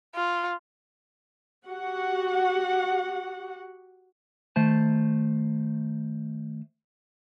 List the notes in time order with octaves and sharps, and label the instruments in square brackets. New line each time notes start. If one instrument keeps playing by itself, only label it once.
[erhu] F4
[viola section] F#4 G4 F#5
[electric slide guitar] D#3 A3 C5 A5